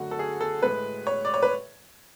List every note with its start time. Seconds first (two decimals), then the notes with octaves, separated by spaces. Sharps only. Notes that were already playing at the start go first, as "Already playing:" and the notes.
Already playing: F#2 D3 F#3 A3 F#4
0.11 A4
0.19 G#4
0.41 A4
0.63 A2 G#3 B4
1.07 C#5
1.25 D5
1.34 C#5
1.43 B4